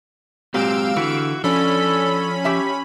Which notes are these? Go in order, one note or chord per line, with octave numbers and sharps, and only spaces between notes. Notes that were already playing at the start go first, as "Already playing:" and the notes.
A#2 F#3 G#3 C4 G4 F5 E6 D7
D3 E3 F#4
F3 C#4 D4 A4 B5
G4 E5 A5